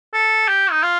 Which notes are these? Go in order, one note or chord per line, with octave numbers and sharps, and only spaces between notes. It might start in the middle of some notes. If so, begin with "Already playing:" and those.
A4
G4
D#4
F4